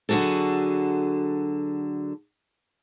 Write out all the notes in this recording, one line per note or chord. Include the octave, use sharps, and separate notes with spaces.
D3 F#3 F#4 G#4 A4